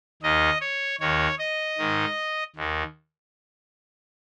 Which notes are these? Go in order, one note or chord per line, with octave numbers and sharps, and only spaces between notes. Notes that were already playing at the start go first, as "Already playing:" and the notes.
D#2 D#3 D#5
C#5
D#2 D#3 C#5
D#5
G#2 D#3
D#2 D#3